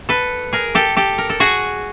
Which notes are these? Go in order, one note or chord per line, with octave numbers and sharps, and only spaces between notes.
A4 B4
G#4 A#4
G4 A4
G4 A4
A#4
A4
F#4 G#4